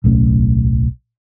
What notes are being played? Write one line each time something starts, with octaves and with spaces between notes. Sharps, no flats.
D1 B1 A3 C#4